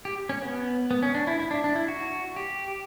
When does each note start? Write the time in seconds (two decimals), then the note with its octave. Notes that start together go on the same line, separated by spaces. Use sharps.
0.05 G4
0.29 C#4
0.42 B3
0.91 B3
1.03 C#4
1.15 D4
1.27 E4
1.40 E4
1.51 D4
1.64 D4
1.76 E4
1.88 F#4
2.36 G4